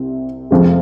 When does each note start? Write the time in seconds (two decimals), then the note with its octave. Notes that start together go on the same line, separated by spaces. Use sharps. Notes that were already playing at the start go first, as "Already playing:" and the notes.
Already playing: C2 C3
0.51 F2 C3 F3 G#3